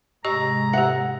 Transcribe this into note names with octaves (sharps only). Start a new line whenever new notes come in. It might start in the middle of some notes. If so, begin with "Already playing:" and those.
G#2 C3 G#3 G4 D#5 A#5 C#6
G4 E5 F#5